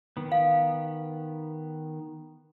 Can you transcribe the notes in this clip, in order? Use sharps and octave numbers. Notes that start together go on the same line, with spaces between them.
D#3 B3
F5